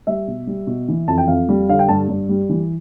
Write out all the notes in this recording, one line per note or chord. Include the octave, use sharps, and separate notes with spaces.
G3 E5
B2
G3
B2
E3
F2 A5
G5
F2 F5
G3
D3 F5
G5
G2 A5
G2
G3
E3